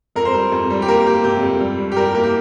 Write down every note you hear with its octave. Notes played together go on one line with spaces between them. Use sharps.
F2 A#4
C5
G3 A#4
F2
G3
G4
A#3 A#4
A#3 G4
C3 G4
F2
G3
G2
G4
G3 A#4
G4
A#3 A#4
G4